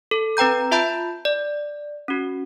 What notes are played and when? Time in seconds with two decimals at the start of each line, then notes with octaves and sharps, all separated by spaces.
0.11 A4
0.37 C4 B4 G5 A#5 G6
0.71 F4 E5 A5 B5 G6
1.25 D5
2.08 C#4 F#4